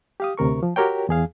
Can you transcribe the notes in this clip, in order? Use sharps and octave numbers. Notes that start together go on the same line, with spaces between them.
G4 F5 D#6
D2 C3 A#4 C#6
F3
F#4 G4 A#4 C#5 G5
E2 G#4 F5